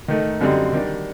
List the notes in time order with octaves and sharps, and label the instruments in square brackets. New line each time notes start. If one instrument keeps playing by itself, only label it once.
[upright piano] D#3 A3 D#4
F#2 D3 G3 C4 D#4
D#3 G3 D4